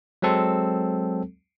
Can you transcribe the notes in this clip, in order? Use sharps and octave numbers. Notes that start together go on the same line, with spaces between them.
F#3 G#3 C4 A4